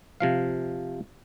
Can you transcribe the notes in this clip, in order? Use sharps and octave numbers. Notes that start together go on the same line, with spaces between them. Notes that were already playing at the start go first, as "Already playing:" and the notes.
C3 F3 F5